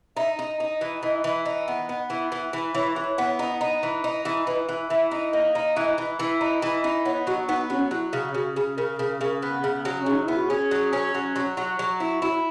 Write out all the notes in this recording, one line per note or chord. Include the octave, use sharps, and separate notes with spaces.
D#4 E5
D#4
D#4 D#5
E3
E3
E3
D#4
B3
B3
E3
E3
E3
E3 C#5
E3
B3
D#4
D#4
E3
D#4
E3
E3 B4
E3
E3 E5
D#4
A#3 D#5
D#4
E3
E3
E3
D#4
E3
D#4
B3 C#5
F#3 F#4
B3 D#4
F#3 C#4
F#3 E4
C#3
C#3 F#4
C#3
C#3 A#4
C#3
C#3
B3
C#3
F#3
C#4
C#3
D#4
B3 E4
F#4
C#4 G#4
F#3
C#4
F#3
F#3
F#3
F#3
E4
E4 F#4